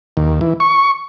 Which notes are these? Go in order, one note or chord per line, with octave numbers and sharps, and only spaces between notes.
D#2
E3
C#6